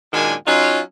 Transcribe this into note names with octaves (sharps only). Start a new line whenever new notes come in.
F#2 A#2 D#3 G#3 D4 G#5
F#3 C#4 D#4 F4